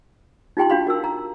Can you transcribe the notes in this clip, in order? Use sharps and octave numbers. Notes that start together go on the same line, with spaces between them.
D#4 F4 G4 G5 A5 C6
D4 F#4 F5 B5 C6
F#4 A#4 E6
A#5